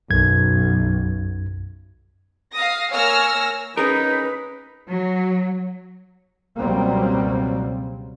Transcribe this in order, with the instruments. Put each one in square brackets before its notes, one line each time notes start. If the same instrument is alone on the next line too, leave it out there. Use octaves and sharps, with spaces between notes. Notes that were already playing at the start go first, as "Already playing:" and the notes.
[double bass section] B1 [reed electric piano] F#2 G#6
[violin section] F5 D#6 A#6
A#3 C#5 G#5 E6 F6 A#6
[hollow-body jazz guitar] C#4 G#4 A#4 [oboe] D#4 [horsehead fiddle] B4
[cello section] F#3
[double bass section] C#2 B2 F#3 G3 A#3 C4